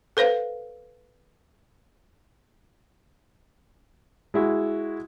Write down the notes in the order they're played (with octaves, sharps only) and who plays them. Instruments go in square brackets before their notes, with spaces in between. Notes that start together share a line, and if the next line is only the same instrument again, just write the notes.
[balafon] A4 B4 C5 F5
[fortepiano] G#3 E4 F#4